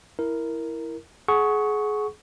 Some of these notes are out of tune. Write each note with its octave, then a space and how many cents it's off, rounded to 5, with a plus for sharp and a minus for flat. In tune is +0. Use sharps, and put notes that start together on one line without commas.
E4 +0 A#4 +0
G#4 +25 F#5 +0 C#6 +0